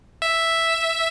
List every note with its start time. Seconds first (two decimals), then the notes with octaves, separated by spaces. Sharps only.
0.22 E5